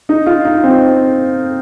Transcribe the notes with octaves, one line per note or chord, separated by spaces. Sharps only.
D#4
F4
D#4
C4